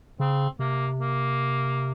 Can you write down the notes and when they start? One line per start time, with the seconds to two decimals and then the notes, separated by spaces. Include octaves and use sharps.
0.20 C#3 C4
0.59 C3 A#3
0.99 A#3